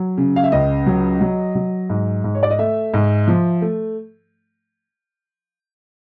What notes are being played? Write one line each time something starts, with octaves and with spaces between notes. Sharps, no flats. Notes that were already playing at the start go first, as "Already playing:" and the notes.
Already playing: F#3
C#3
F5
E5
C#2 D#5
F#3
F#3
F#3
G#2
G#2
C#5
D5
D#5
A3 E5
G#2
F3
A3